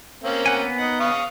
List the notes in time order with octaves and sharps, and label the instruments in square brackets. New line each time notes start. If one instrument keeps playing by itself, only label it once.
[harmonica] A#3 C4 C#4
[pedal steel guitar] F#5 G#5
B3
[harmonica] D#4 F#5
F5 C#6 D#6